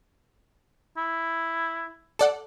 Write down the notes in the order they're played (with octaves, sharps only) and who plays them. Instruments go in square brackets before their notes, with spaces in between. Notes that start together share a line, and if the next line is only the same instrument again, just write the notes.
[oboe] E4
[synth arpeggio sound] A4 D5 F#5